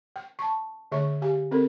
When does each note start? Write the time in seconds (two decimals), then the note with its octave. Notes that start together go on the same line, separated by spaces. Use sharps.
0.16 G5
0.39 A5 C#6
0.92 D3 A3 G#4 C#5 E5 C#6
1.22 G4 F5 G#5
1.51 C4 A4 A#4